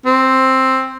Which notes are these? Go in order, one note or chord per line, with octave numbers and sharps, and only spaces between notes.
C4